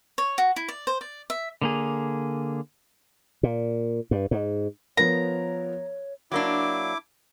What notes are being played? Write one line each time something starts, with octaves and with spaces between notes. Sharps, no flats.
C#5
F#4
E4
D5
C5
D5
E5
D3 A#3 G#4
A#2
G2
G#2
F3 B3 A#4 C#5 A#5
F#3 A#3 D4 E4 D6